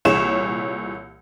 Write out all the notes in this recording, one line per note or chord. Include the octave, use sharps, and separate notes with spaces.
C2 A#2 E3 G#4 C#5 E7